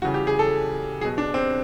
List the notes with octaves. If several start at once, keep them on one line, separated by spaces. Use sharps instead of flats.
C#3 E3 G3 F#4
G4
G#4
A4
B2 F#3 G#4
D4
C4